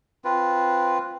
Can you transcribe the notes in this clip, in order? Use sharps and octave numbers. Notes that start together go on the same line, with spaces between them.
C4 F4 B4